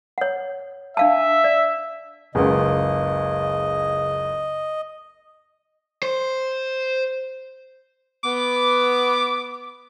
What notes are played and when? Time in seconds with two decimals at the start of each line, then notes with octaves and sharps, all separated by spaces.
0.18 C#5 F#5
0.97 D4 E5 F5 A5
1.44 D5
2.35 F#1 C#2 C#3 G#4 B4 D#5 F#5
6.03 C5
8.24 B3 D6